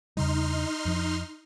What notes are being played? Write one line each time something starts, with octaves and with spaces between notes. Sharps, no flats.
E2 C#3 G3 D#4 C6 F6
F2 F3